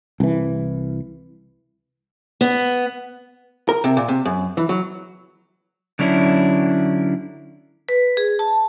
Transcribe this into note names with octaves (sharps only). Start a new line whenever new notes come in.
C2 E3
B3
A#4
C3
A#2
C3
F#2
E3
F#3
D3 F#3 C#4 D4 E4
B4
G#4
A5